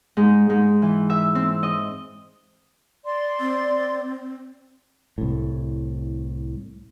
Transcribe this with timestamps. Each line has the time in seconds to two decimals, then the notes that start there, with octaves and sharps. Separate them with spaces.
0.17 G#2
0.50 G#2
0.82 E3
1.10 E5
1.35 C4
1.63 D#5
3.05 D5 C6
3.40 C4
5.18 C2 A2